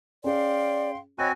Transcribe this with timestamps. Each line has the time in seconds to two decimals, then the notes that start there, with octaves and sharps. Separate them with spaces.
0.24 C#4 G#4 D5 F5 G5 C6
1.19 C4 F#4 C#5 D#5 G#5 B5 F#6